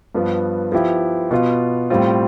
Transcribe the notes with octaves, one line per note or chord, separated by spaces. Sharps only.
G2 F3 B3
F3 B3 E4 G4
B2 B3 F4
A2 G3 C4 F4